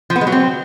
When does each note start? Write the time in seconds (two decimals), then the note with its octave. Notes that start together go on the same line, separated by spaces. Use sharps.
0.10 F3
0.16 B3
0.21 G#3
0.27 F#3
0.32 C4